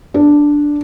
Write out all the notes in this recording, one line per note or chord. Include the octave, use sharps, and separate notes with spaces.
D4